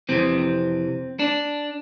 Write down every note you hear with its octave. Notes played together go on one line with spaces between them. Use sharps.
F2 C3 E3 C4
D4